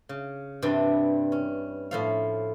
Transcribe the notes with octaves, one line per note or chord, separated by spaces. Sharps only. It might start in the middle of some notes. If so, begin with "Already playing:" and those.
C#3
G2 C3 E3 G3 D4
C#4
A2 F3 F5